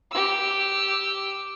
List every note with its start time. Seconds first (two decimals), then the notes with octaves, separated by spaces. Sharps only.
0.11 G4 E6